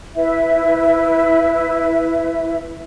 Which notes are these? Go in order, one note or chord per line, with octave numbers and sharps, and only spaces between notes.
E4 B4 E5